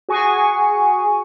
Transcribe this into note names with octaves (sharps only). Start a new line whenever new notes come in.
F#4 G#4 G#5 C#6